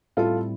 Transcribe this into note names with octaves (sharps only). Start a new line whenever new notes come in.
A2 G3 C4 E4 F4 A4